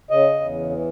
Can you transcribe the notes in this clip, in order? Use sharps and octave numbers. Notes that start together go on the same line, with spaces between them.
C#3 D#5
E2
E3